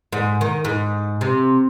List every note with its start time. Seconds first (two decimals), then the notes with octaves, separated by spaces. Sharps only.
0.12 G#2
0.41 D#3
0.65 G#2
1.21 C3